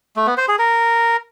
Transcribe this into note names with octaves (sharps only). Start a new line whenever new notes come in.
A3
B3
C5
G#4
A#4